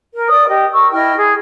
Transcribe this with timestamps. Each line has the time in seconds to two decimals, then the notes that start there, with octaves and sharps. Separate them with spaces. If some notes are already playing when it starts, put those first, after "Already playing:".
0.13 A#4
0.28 D5 D#6
0.47 G4 D#5
0.72 A#4 C#6 E6
0.92 E4 D#5 G5 F6
1.16 G#4